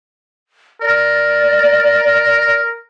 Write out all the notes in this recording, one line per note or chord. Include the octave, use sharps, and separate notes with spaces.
A#4 D5